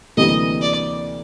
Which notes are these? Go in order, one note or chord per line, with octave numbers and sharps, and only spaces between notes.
D2 C3 E3 G3 A#3 D#5
D5